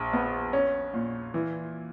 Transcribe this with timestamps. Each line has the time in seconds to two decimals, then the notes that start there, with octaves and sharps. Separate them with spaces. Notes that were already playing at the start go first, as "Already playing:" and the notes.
Already playing: A#1
0.13 B3
0.53 C#4
0.94 A#2
1.34 E3